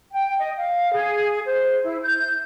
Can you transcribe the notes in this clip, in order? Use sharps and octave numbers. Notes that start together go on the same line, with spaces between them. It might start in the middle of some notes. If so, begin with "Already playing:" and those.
G5
D#5
F5
G#4
C5
E4
G6